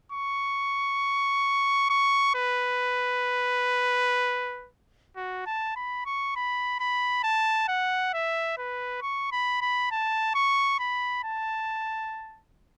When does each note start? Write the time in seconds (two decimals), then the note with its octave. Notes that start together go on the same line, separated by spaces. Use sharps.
0.12 C#6
1.90 C#6
2.35 B4
5.17 F#4
5.46 A5
5.76 B5
6.06 C#6
6.36 B5
6.80 B5
7.24 A5
7.69 F#5
8.14 E5
8.58 B4
9.02 C#6
9.32 B5
9.61 B5
9.91 A5
10.35 C#6
10.79 B5
11.24 A5